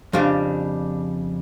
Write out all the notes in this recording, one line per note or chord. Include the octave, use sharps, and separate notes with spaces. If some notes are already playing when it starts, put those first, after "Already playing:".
F2 C#3 G3 D4